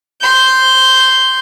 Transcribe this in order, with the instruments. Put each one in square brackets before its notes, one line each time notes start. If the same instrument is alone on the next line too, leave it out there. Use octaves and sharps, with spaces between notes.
[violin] C6 G6